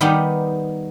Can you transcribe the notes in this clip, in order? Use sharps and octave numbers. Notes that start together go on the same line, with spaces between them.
D#3 G3 B3 D#4 G4